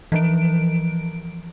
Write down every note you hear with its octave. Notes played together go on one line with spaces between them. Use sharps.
E3 F3 D7